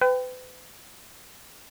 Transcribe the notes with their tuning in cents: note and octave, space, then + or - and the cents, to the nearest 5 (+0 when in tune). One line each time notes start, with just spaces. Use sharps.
B4 +40 G5 +0